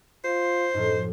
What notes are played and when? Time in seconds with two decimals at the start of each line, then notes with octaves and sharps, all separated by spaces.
0.24 F4 C5
0.74 F#2 A2 F3 D#4